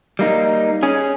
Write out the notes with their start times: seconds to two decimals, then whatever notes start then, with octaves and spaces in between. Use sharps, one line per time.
0.19 G3 A#3 D#4
0.83 C#4 G#4